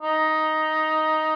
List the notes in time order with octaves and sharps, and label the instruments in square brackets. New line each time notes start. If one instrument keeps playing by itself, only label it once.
[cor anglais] D#4